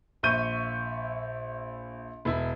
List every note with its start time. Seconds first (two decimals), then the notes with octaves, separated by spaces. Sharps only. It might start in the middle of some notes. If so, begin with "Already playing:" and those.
0.23 A#1 E5 C#6 G6 D#7
2.25 E1 E4